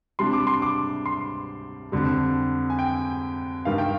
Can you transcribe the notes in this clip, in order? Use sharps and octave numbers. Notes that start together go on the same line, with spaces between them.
C3 G3 D4 C6
D6
C6
D6
C6
F2 D3 G3
G#5
G5
G2 D#3 G3 F5
G5